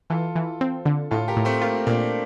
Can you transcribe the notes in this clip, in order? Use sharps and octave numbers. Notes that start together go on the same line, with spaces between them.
E3 F4 A4
E3
C4
D3
A2 F4 A4
G4 A#4
A2
A3 C4
A#3 F4
A#2 A#3 D4